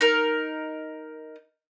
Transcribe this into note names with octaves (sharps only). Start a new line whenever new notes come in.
D#4 A#4